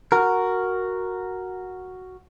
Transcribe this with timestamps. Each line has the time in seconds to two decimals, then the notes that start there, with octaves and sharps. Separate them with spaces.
0.12 F#4 A#4